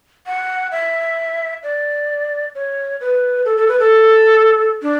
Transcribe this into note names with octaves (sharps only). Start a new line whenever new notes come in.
F#5
E5
D5
C#5
B4
A4
A4
B4
A4
D4